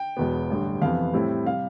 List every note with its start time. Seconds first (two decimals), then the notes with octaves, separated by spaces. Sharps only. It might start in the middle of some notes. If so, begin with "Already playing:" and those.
Already playing: G5
0.17 E1 E2 B2 B3
0.50 A1 G2 D3
0.82 F2 C3 E3 B3 F5
1.13 A2 G3 C4 E4
1.46 C3 G3 F5